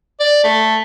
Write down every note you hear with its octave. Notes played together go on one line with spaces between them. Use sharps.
D5
A3